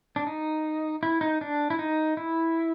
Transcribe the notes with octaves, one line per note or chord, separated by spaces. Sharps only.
D4
D#4
E4
D#4
D4
E4
D#4
E4